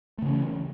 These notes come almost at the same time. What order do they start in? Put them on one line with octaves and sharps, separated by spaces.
A3 C#3 C#4 E3